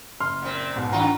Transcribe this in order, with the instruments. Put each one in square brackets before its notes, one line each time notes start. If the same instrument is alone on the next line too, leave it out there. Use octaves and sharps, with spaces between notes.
[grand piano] F#1 C6 F6
[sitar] A#2 C4
[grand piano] B1 G#2 B2
[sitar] F#2 D#3 F4 [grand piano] F#5 A#5